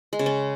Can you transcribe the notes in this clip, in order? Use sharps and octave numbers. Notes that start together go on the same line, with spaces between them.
G#3
C#3
C#4